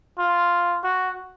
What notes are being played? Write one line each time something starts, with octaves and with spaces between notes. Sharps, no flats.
F4
F#4